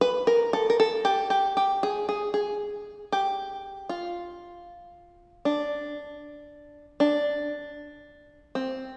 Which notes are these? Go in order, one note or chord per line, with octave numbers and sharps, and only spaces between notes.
B4
A#4
A4
A#4
A4
G4
G4
G4
G#4
G#4
G#4
G4
F4
D4
D4
C4